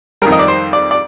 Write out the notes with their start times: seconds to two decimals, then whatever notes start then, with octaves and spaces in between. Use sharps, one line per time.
0.22 F2 D#3 G3 A#4
0.32 D#5
0.39 D5
0.48 C5
0.73 D5
0.91 D5